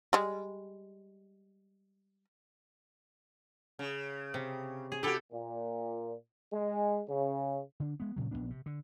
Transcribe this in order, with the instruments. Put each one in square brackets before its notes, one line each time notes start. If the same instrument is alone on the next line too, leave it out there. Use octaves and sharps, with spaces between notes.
[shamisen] G3 G#3
[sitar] C#3
[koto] C3
G#4
[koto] E4 A4 [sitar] F#4 G4
[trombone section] A#2
G#3
C#3
[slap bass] D3 D4
G#3 B3
A#2 C#3 F#3
A#1 A2 B3 D4
C3
D3